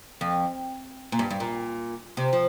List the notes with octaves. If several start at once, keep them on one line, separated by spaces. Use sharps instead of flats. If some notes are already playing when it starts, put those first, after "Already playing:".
F2
A#2
G2
G2
A#2
C3
F3